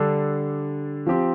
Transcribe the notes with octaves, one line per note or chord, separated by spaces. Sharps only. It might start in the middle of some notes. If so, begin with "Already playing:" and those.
Already playing: D3 G3 D4 A4
F3 C4 G4